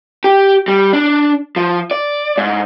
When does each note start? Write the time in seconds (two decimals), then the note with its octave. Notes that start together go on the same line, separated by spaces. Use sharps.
0.24 G4
0.68 G3
0.93 D4
1.56 F3
1.91 D5
2.38 G#2